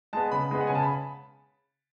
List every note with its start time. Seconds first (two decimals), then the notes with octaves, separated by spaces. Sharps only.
0.13 G#3 B3 A5
0.32 C#3 B5
0.51 G#3 B3
0.61 F#5
0.67 C#3 G#5
0.75 A5
0.83 B5